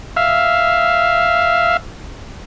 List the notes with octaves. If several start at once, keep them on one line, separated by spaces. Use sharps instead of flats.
E5 F5